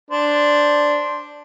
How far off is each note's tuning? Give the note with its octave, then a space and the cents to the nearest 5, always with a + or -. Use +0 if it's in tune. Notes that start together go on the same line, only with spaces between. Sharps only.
D4 -5 C5 +0